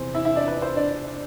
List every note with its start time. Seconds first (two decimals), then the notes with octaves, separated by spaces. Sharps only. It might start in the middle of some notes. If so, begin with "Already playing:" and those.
Already playing: E2 C3 E3 C5
0.14 E4 E5
0.25 E4 E5
0.36 D4 D5
0.48 B4
0.62 C5
0.76 D4 D5